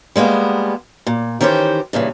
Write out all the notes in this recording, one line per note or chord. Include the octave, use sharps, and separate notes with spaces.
G3 G#3 A#3 B3
A#2
D#3 E3 C#4 G4 C5
G2 A#2 C#3 E3